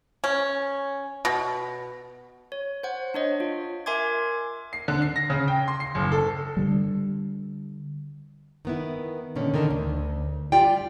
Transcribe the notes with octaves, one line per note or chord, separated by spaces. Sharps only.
C#4
B2
C#5
C5 F#5
D4 C#5 D#5
F4
A#4 E5 G#5 C6 D6 G#6
C7
D3
C7
A#6
C#3
G5
C6
C7
F#1
A4
D3 G3
D#3 B3 E4
A#2 D3 D#3 C#4
D3 D#3 A#4
D2
G3 F4 G4 D5 G5